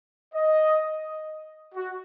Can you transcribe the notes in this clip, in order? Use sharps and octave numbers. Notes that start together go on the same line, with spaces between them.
D#5
F#4